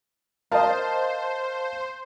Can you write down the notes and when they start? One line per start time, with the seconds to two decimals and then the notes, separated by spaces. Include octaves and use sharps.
0.52 A#4 C5 D#5 F5 A5